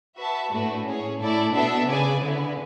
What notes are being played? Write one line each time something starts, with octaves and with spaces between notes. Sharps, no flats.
F#4 B4 E5 A5
A2 A3 D4 F#4 B4
C#4 G#4 C#5
A2 E4 A4 D5
B2 B3 D4 A4 E5
C#3 G#4 B4 D5 G#5
D3 B3 E4 B4